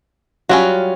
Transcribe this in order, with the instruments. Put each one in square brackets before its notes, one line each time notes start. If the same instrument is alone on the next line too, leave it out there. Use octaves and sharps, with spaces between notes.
[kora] F#3 G3 [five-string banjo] C#4 F4 F#4